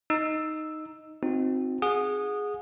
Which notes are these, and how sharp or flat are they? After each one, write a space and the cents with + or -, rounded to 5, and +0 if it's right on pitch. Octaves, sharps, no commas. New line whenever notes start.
D#4 +0 E6 +0
C4 +0 D#4 +0 F#4 -40
G#4 +0 F#5 -30 D#6 -15